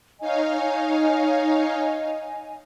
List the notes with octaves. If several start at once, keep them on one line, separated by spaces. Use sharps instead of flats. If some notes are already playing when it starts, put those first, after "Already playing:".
D#4 C#5 D#5 F5 G#5